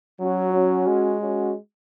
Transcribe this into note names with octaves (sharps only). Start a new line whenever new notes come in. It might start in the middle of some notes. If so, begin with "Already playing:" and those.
F#3 C#4 F#4
C#4 F#4
G#3
C#4 F#4